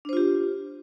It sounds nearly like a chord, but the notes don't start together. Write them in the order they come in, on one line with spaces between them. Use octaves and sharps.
D4 C5 F4 G4